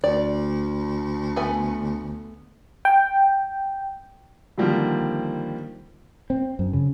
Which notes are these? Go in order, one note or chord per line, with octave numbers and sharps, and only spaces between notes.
D2 D5
A3 B3 G#5
G5
D3 D#3 F3 G3 A#3 C4
C4
F#2
C#3